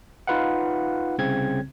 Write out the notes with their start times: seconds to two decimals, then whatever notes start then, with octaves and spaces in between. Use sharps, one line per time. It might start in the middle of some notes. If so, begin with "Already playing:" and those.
0.27 D#4 F4 B4 F5 F#5
1.18 C2 C#3 C4 G#6